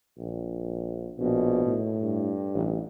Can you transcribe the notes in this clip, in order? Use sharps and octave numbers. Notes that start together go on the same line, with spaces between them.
A#1
A#1 B2
A2
G2
A1